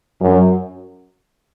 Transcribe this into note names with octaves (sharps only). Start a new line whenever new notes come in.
F#2